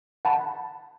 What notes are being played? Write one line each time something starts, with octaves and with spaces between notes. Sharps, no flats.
F#5 A5 B5